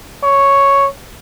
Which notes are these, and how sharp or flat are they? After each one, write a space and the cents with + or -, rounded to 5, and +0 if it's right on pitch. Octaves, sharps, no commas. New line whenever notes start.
C#5 +0